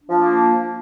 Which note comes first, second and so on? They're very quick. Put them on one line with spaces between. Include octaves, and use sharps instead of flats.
D4 F3 A#3